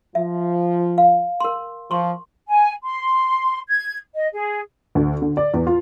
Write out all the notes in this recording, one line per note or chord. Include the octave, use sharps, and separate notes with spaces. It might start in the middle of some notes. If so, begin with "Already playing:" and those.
F3 E5
F5
A#4 C6
F3 C6 C#6
G#5
C6
G#6
D#5
G#4
D2
D3
D5
E2
F4